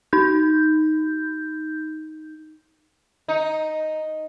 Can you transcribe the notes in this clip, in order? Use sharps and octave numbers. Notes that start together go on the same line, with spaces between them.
D#4 G6
D#4